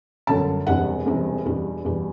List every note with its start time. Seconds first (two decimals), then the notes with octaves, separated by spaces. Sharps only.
0.27 G1 F#2 D3 F#3 A5
0.67 E1 E2 C3 G3 D4 F#5
1.06 E1 E2 C3 G3 D4
1.45 E2 B2 G3 D4
1.85 E2 B2 G3 D4